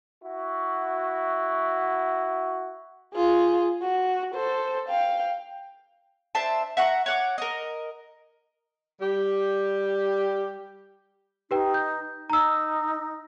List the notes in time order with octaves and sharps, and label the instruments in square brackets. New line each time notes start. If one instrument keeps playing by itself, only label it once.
[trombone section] E4 F#4
[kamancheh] F4 G#4
F#4
A4 C5
F5 G5
[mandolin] D4 C5 E5 A5
E5 F#5 A#5 C#6
C#5 F#5 D6
A#4 D#5
[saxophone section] G3 G4
[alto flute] D#4 [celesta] G4 B4 G5
[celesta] G6
[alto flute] D#4 [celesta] A#5 E6